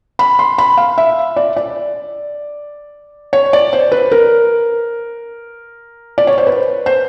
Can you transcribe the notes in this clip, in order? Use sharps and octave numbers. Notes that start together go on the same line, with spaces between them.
B5
C6
B5
F5
E5
D5
D5
C#5
D5
C5
B4
A#4
D5
C#5
C5
B4
C5